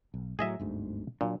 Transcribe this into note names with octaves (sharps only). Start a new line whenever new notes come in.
B1
A2 D#3 F#3 G#4 D#5 E5
G1 D2 G#2
A#2 F#3 D4